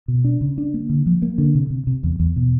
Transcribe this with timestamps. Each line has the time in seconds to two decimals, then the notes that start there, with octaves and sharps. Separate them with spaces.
0.08 B2
0.24 D4
0.41 C#3
0.58 D4
0.74 A#3
0.89 D3
1.06 F3
1.22 A#3
1.38 D3
1.55 C3
1.70 C3
1.87 C3
2.03 E2
2.20 E2
2.36 B2